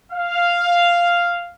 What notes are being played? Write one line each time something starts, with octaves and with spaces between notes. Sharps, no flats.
F5